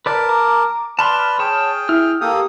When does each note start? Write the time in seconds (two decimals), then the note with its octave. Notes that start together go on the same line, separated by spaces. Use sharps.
0.06 A#4 B4 D5 A5
0.29 A#5 D6
0.99 B4 D5 A5 B5 C6 F6
1.39 G#4 C#5 G5 A5
1.89 E4 F6
2.21 A#3 G4 A4 D#6